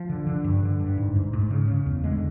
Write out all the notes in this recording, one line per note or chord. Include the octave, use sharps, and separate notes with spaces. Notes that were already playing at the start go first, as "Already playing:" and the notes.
Already playing: F3
D3
D3
G2
D3
G2
G#2
G#2
G#2
C#3
C#3
E2
D3 G#3